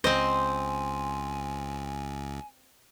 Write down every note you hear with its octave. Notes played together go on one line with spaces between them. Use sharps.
C#2 C4 C5 D#5 G#5